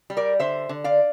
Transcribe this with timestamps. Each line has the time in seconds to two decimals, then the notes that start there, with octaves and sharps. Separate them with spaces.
0.10 G3
0.17 A#4 D5
0.39 D3 C5 E5
0.69 D3
0.84 D5 F5